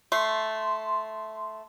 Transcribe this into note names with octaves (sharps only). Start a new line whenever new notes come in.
A3 C6